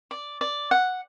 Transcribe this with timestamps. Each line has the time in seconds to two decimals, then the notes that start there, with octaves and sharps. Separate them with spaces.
0.11 D5
0.41 D5
0.71 F#5